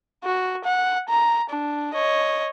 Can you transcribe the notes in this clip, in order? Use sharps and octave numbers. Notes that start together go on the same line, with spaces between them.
F#4
F#5
A#5
D4
C#5 D#5